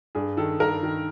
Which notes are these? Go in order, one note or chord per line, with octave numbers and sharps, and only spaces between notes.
G2 G#4
D#3 A4
G2 A#4
D#3